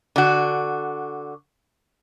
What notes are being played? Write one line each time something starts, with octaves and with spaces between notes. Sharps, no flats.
D3 F#4